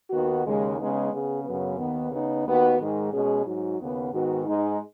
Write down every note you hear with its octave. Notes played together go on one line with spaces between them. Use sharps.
D#2 D#3 B3 F#4
D#2 C#3 G#3
C#3 G#3 B3 D#4
C#3 B3 G#4
F#2 C#3 F#3 B3
D#2 D#3 B3
C#3 B3 D#4
D#2 D#3 B3 F#4
G#2 D#3 G#3
B2 G#3 C#4 G#4
G#2 F#3 D#4 F#4
D#2 C#3 B3
G#2 D#3 B3 F#4
G#2 G#3 D#4